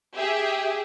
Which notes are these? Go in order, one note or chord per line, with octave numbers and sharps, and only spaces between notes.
G4 G#4 E5